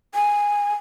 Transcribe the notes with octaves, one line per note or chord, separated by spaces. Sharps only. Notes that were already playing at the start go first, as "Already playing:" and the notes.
G#5